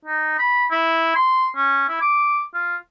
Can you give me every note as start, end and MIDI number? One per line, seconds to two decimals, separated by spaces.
0.05 0.35 63
0.39 0.64 83
0.71 1.14 64
1.16 1.47 84
1.56 1.86 61
1.88 1.98 64
2.01 2.42 86
2.54 2.76 65